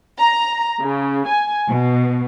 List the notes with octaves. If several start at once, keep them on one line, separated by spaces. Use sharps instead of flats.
A#5
C#3
G#5
B2